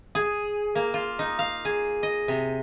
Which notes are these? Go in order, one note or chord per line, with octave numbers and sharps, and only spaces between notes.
G#4
A#3
F4
D#4
F5
G#4
D#5
C3